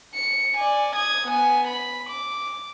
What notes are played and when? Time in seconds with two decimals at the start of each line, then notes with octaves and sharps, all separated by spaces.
0.14 C#7
0.57 D5 G#5
0.96 D#6 G#6
1.27 B3 G#5
1.67 B5
2.09 D6